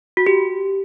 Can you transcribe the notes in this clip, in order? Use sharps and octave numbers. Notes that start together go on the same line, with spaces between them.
F#4
G4